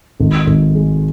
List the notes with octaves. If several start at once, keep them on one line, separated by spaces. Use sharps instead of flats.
G#1
G#1
G#3